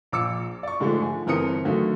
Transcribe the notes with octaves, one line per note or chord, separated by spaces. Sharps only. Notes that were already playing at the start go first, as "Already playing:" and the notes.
A#1 D6 E6 C#7
D5 C#6
G#2 D3 F3 G#3 A3
G#5
G1 E3 C4 A#4 D#6 C#7
D3 D#3 F#3 A3